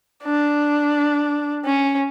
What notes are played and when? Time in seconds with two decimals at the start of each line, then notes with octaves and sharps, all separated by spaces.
0.24 D4
1.65 C#4